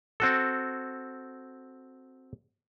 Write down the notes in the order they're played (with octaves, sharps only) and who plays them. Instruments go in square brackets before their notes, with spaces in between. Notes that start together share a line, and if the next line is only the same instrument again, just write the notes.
[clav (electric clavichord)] C4 F#4 A4